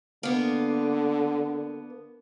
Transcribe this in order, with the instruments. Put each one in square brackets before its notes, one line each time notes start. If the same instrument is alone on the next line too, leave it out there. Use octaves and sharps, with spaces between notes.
[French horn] D3 [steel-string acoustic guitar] A#3 B3